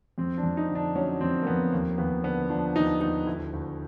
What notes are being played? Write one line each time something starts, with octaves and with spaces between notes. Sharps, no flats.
F2 C4
D4
F2
D#4
D3
D4
F#3 C#4
F2 C4
A#3
F2 B3
D#2 A#3
D#2 B3
D3 B3
F3 D4
D#2 D#4
D#2 D#4
D2 E4
D2